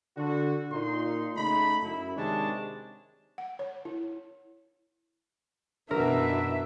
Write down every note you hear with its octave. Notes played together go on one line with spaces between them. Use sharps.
D3 F#4
A#2 D#4 C6
C#3 A3 D#4 B5
F#2 E4
C3 D#3 G#3 D4 C#5 A5
F#5
C#5
E4
F#2 B2 E3 D4 F#4 A#4 B4 E5